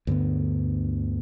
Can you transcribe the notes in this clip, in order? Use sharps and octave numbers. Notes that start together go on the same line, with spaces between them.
D2 G2 D3 B3